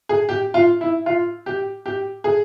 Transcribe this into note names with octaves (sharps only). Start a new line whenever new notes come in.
G#4
G4
F4
E4
F4
G4
G4
G#4